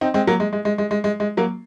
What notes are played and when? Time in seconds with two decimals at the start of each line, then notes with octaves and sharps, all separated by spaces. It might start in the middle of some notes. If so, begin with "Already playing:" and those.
0.01 C4 D#4
0.14 G#3 C4
0.27 F#3 A#3
0.40 G#3
0.53 G#3
0.65 G#3
0.78 G#3
0.91 G#3
1.04 G#3
1.20 G#3
1.37 F#3 A#3